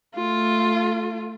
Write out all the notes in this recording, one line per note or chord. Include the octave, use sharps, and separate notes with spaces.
A3 F4